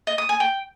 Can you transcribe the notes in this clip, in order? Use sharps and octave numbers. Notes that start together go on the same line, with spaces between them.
D#5
D#6
G#5
G5